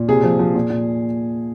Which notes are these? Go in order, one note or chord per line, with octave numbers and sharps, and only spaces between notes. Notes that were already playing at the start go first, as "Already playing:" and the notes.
Already playing: A#2
C3 G#4
F3
F3
A#2
A#2